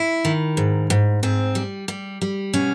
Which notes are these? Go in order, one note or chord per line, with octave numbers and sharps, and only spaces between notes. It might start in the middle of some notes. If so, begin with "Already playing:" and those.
Already playing: E4
D#3
G#2
G#2
G#2 C4
G3
G3
G3
B2 C#4